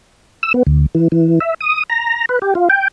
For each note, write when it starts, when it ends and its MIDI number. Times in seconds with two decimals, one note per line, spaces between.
0.43 0.53 88
0.54 0.63 59
0.67 0.86 38
0.95 1.08 52
1.12 1.39 52
1.40 1.54 76
1.60 1.83 87
1.90 2.25 82
2.29 2.39 71
2.42 2.54 67
2.55 2.68 65
2.69 2.88 79